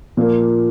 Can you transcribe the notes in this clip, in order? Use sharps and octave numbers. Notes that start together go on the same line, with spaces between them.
A#2 F3 A#3